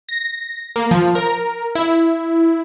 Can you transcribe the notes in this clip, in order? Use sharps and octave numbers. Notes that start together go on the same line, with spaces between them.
A#6
A#3
F3
A#4
E4